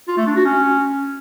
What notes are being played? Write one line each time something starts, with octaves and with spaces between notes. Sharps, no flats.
F4
A3
D4
F#4
C#4